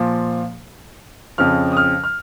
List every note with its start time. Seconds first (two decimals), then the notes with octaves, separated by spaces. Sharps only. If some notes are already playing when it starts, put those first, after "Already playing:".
Already playing: A#2 F3
1.38 F2 C#3 F3 F6
1.72 D#6
1.77 F6
2.04 F6